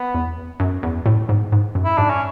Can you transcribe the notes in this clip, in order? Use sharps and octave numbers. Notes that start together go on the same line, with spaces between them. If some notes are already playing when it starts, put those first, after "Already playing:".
Already playing: B3
E2
F#2
E2
A2
G#2
G#2
F#2
E4
G#2 D4
C#4